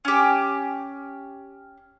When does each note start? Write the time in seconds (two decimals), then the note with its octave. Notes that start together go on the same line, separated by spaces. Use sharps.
0.05 C#4 G4